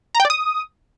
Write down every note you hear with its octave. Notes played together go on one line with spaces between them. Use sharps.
A#5
G5
D5
D#6